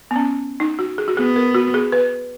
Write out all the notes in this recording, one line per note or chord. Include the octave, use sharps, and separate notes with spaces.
B3
C#4
D#4
F#4
G#4
F#4
B3 G#4
A#4
F#4
G#4
B4